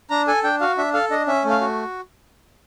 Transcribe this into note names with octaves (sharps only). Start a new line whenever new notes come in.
D4 A#5
A4 G#5
D4 G5
F#4 F5
D4 E5
A4 F5
D4 D#5
C#4 E5
A3
F5
F#4